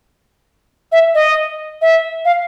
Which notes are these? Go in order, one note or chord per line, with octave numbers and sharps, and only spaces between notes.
E5
D#5
E5
F5